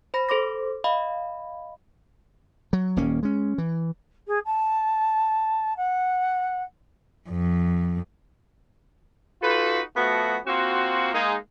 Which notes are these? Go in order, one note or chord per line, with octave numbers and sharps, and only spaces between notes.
C5 B5 A#6
A4 C5 C6 D6 A#6
D#5 F5 B5
F#3
D#1 D#2 A#3 C#4
G#3 C#4
E3
G#4
A5
F#5
F2
D#4 F4 F#4 A4 B4
F3 A3 B3 F#4
A#3 C4 F4 F#4
G#3 A#3 D#4